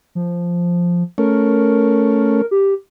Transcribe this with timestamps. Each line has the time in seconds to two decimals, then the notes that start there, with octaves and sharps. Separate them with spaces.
0.15 F3
1.18 A3 C#4 A#4
2.51 G4